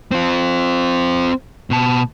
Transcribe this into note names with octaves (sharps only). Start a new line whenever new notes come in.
C4 F4
B2 A5